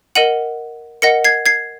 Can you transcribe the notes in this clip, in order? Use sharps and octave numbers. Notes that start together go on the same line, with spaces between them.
A#4 D#5 F#5 D#7 F#7
A#4 D#5 F#5 A#6 C#7
G#6 C7
G#6 C7